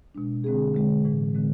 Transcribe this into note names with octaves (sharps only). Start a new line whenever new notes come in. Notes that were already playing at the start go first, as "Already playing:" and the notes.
B2 G#3 D4
D3 G#3 C4 G#4
D3 G#3 C4
A2 E3 G#3
D3 G#3 C4